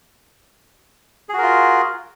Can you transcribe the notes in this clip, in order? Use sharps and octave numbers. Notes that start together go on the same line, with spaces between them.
F4 F#4 G#4 A#4